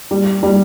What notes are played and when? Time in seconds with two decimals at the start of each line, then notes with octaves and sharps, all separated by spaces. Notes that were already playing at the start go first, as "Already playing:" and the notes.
0.11 G3
0.43 G3